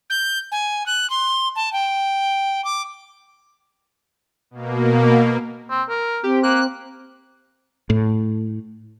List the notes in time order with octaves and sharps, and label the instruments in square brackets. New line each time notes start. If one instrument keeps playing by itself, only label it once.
[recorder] G6
G#5
F#6
C6
A5
G5
D6
[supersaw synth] B2 A#3
[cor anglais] C4
A#4
[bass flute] C4 [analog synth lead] G4
[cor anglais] A#3 [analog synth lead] F#6
[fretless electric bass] A2